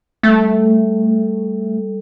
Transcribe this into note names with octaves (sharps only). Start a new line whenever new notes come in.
G3 A3 A4